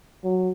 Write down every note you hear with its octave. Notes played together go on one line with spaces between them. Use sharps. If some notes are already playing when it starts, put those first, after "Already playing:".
F#3